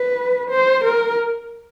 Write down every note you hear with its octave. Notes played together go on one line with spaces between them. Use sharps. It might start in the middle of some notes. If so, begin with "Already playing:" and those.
Already playing: B4
C5
A#4